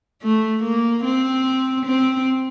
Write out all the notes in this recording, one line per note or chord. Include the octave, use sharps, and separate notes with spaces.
A3
A#3
C4
C4